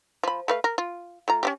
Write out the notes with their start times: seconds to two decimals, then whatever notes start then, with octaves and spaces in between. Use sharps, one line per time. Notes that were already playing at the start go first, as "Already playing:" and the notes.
0.23 F3 B5
0.48 A3 B4 F5
0.64 A#4
0.78 F4
1.28 A3 F4 A#5
1.43 C#4 D4 G4